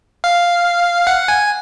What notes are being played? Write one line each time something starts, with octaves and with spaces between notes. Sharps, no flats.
F5
F#5
G#5